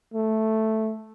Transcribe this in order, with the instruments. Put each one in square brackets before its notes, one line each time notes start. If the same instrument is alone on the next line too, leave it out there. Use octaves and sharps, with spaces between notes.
[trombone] A3